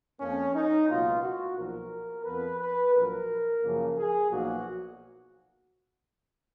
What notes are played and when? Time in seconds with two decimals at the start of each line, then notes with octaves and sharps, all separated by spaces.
0.20 F2 F3 A#3 C#4
0.54 D#4
0.88 C#2 B2 F#3 A#3 F4
1.23 F#4
1.56 B1 A#2 F3 A#4
2.25 F2 F3 B3 B4
2.59 B4
2.93 A#1 A#2 F#3 A#4
3.62 F#2 C#3 F3 A#3
3.96 G#4
4.30 B1 A#2 F3 A#3 F#4